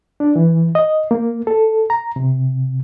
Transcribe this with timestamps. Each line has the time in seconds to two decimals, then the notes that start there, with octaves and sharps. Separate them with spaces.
0.20 D4
0.36 E3
0.75 D#5
1.11 A#3
1.47 A4
1.90 A#5
2.16 C3